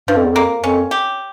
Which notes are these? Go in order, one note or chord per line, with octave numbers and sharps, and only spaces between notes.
G2 F3
F2
E2
F2 A#3
F2 C#4
G4